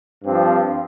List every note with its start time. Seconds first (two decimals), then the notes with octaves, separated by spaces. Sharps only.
0.25 G2 F3 C4